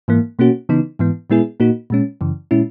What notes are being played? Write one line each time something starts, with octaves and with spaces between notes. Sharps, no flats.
G#2 E3 A#3
B2 A#3 C#4 F#4
C#3 E3 B3 D#4
G#2 E3 B3
A#2 G#3 B3 E4 G#4
A#2 A#3 D#4 F#4
A#2 G#3 C#4
F#2 C#3 E3
A#2 G#3 C#4 E4